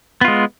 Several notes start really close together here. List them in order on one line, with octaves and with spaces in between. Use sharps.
B3 F4 G#3